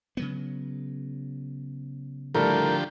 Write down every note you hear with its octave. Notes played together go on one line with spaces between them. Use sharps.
C#3 F#3 B3
A2 D3 F3 G3 G4 A4 A#4